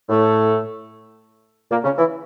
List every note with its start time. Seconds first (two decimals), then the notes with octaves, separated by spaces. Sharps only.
0.09 A2 A3
1.71 A#2 A#3
1.84 C#3 C#4
1.98 E3 E4